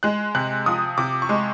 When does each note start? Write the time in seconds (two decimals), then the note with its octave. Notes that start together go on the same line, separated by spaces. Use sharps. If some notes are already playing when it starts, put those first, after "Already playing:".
0.03 G#3 F#6
0.35 C3 F#6
0.66 F3 D#6
0.98 C3 D6
1.22 C#6
1.29 G#3